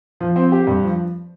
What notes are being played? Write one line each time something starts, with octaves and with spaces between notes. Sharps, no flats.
F3
C4
G4
G2
F3